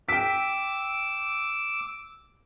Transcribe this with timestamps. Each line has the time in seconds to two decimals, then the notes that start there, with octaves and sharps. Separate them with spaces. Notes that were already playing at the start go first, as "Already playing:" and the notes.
0.09 G5 D6 E6 B6